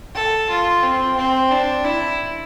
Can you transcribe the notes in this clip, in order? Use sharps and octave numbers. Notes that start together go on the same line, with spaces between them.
A4
F4
C4
C4
D4
E4